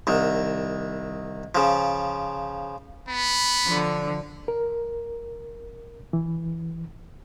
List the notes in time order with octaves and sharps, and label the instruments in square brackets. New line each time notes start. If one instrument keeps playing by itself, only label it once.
[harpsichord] C2 D#3
C#3 F3
[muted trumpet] B3 [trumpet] B5
[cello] D3 F3
[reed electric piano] A#4
E3